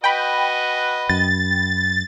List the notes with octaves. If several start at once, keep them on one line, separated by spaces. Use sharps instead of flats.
F#4 B4 D#5 G5 B5
F#2 A6